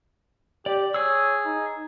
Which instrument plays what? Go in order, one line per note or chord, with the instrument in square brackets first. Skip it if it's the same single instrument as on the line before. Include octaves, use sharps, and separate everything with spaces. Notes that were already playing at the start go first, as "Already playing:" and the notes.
[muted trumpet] G4 [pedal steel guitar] D5
[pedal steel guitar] G#4 E6 [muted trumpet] C#5
[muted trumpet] D#4